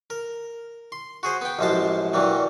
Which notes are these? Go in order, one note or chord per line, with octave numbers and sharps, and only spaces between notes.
A#4
C6
F#4 G#4 C5
B3 G5
A1 F#2 F3 G#3 C5 A5
G2 A#2 E3 F#3 G3